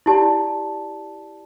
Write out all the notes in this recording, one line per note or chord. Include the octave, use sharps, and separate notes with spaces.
E4 G4 D5 A5